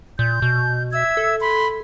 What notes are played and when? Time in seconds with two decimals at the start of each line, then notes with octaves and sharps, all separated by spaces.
0.19 A#2 G6
0.42 B2
0.92 E5 E6 G#6
1.17 A4
1.39 B5 C6